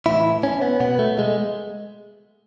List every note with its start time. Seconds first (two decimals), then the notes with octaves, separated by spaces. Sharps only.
0.06 A2 E3 E4
0.43 C#4
0.62 B3
0.80 B2 B3
0.99 A3
1.19 G#3